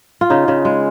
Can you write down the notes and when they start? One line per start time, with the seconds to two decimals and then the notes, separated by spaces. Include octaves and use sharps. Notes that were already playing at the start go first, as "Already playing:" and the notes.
0.21 F4
0.30 C#3 D#4
0.48 C#3
0.65 G#3